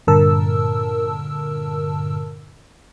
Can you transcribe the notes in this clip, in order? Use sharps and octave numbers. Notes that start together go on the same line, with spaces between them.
G2 A#2 D3 A#4 A5 E6